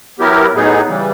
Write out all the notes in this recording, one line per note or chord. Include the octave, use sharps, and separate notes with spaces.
F#3 B3 E4 G4 A#4
A2 F#3 B3 D#4 G#4
C#3 E3 G3